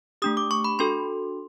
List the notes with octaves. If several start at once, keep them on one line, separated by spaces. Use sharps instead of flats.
A3 D4 G4 D#6
D6
C#6
B5
D4 F#4 A4 C6